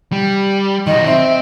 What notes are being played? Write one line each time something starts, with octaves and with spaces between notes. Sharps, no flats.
G3
D#3 F#3 D#5
C4 E5